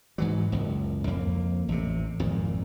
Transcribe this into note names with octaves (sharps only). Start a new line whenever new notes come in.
G#2 E3 F#3
F#1 C#2
F2 A#3
A1 C3
G#1 F2 A#2